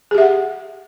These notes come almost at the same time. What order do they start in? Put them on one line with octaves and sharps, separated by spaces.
G#4 G4 E5 F#5